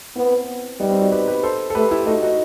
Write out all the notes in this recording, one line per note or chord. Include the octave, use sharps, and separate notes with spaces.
B3 C4 E4
G3 B3 D#4
C4
D#4 F#4
G4 B4
G4 B4
A4 C5
A4
A3 G4 B4
E4 G4
A3 D#4 F#4
D#4 F#4